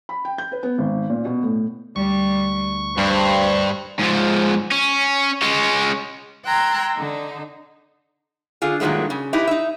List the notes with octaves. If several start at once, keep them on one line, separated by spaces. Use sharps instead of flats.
B5
G5
G6
B4
B3
G#1
A#2
B2
A2
D2 G3 C#6
G2 C5
G#2 F3
C#4
G#3 C#4
G5 A#5 C6 E6 F#6 G#6
D3 D#4
D3 F4 G#4
G2 A#2 D#3 F#3 G#3 A3
C#3
D#4 E4 G4 B4
D#4 E5